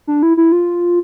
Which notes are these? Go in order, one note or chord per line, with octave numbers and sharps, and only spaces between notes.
D4
E4
E4
F4